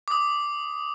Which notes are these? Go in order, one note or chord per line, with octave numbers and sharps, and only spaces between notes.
D6 D#6